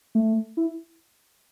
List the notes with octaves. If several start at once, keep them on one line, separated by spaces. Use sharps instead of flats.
A3
E4